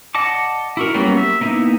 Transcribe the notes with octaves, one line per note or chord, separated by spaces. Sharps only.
D5 D#5 F#5 A5 D6
E4 F#4 A#4
F#3 G3 A#3 B3 C#4
E5
A#3 B3 D#4 E4